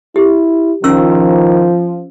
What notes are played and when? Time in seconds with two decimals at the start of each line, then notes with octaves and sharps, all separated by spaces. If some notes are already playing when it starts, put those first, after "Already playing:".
0.16 E4 G4
0.84 D#3 F3 C#4 C#6 E6